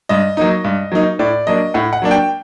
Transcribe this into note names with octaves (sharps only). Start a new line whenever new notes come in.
G2 D#5
F#3 A#3 D#4
G2
F#3 A#3 D#4
A2 D5
F#3 A#3 D4 D#5
A2 F#5
F#5
F#3 A#3 D4
G5